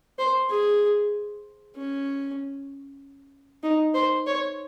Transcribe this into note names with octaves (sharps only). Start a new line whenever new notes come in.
C5
G#4
C#4
D#4
C5
C#5